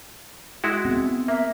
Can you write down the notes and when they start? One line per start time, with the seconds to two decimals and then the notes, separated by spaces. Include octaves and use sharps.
0.64 G#3 E4 F#4
0.85 B3 C4
1.28 A#3 E5